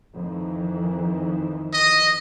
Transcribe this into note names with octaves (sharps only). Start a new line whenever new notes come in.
F2 D#3 E3
D#5